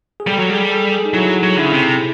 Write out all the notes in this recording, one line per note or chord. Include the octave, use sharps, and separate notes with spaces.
G#4
G3 A4
F#3
G3 G#4
A4
G#4
D#4
F#3 E4
F#3
D3 E4
C#3
C3